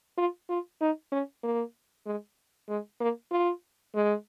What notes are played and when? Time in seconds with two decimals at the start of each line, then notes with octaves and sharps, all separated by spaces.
0.17 F4
0.49 F4
0.81 D#4
1.12 C#4
1.43 A#3
2.06 G#3
2.68 G#3
3.00 A#3
3.31 F4
3.94 G#3